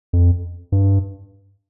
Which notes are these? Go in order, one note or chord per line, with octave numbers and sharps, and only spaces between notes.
F2
G2